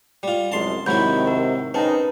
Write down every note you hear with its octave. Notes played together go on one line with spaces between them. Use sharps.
G3 F4
C2 F#2 G#3 A5 C6
G#2 C3 D#3 F#3 E4 B5 G6
A#4
C#3 C4 D#4 B4 A5